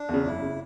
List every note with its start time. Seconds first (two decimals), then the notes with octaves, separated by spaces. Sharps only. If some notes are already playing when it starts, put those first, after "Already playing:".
Already playing: D4
0.09 E2 C#3
0.25 F#1 E4
0.42 C#3